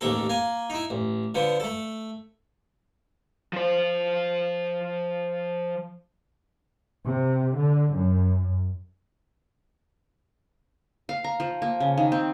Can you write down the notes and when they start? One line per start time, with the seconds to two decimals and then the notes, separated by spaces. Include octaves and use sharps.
0.01 A1 D#2 A#3 A4
0.29 A#3 G#5
0.70 D#4 E4
0.90 A1
1.35 D3 F3 B3
1.60 A3 A4
3.53 F3 C5
7.06 C3
7.58 D3
7.95 F#2
11.09 F5
11.24 A#5
11.40 F3
11.62 A#3
11.80 C#3
11.98 D#3
12.12 C4